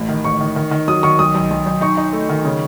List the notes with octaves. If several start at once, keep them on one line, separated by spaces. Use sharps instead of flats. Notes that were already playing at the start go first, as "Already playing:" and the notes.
Already playing: A1
D#3
A1 C#6
D#3
D#3
D#3
F#3 D#6
D#3 C#6
B1 D#6
B1
B1
B1
D#4 C#6
D#4
A3
D#3
C#3